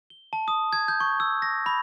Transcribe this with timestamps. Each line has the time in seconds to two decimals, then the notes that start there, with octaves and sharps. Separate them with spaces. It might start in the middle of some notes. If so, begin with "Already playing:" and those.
0.10 G7
0.33 A5
0.48 D#6
0.73 G#6
0.88 G6
1.00 C#6
1.20 E6
1.42 A#6
1.66 B5